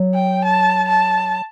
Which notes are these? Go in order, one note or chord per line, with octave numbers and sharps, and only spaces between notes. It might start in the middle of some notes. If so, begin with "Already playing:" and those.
Already playing: F#3
G5
A5
A5